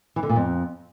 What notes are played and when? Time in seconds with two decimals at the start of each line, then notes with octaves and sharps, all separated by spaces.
0.16 E3
0.23 D3
0.29 A#2
0.36 F2